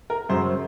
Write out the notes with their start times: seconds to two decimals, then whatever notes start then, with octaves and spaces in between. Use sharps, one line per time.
0.10 A#4
0.29 F#2 C#3 F#3 C5